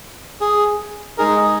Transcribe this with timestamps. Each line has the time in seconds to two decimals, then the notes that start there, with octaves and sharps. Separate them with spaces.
0.41 G#4
1.18 G#3 D#4 G#4 A#4
1.37 D#5